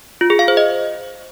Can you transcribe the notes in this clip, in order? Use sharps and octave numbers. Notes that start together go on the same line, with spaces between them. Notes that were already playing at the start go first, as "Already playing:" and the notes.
F4
G#4
F5
C5
D#5